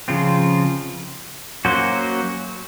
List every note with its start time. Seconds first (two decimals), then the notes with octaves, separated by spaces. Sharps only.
0.08 C#3 F3 C4 F4
1.65 F#3 A#3 C#4 F#4 C5